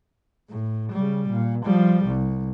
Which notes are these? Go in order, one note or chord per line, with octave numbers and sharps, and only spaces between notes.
A2
C#3 G3
A#2
F3 G3
C2